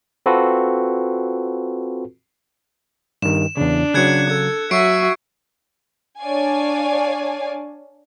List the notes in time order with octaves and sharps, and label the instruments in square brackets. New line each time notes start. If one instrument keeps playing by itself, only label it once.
[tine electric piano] C4 F4 F#4 A4 B4
[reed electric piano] G2 D#3 [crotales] E7
[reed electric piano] E2 C#3 [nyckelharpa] D4
[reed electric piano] C#3 F#3 [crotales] F#6 G#6 C#7
[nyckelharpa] A4 [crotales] G#6
[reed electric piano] F#3 [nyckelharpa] F#4 E5 [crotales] C#6 C7 D7
[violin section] D4 C#5 D5 F5 G#5